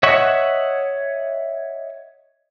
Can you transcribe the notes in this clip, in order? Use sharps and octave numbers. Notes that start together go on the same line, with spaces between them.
C#5 D#5 E5 F#5 C#6